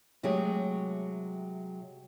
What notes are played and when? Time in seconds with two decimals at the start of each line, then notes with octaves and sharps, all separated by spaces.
0.23 C3 F#3 G#3 A3 G4 G#4